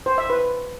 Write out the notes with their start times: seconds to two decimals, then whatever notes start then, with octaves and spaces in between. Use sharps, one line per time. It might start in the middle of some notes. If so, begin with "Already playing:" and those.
0.06 C5
0.18 E5
0.30 B4